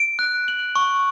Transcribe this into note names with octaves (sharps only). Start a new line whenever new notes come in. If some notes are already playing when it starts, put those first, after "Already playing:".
Already playing: D7
F#6
F#7
C#6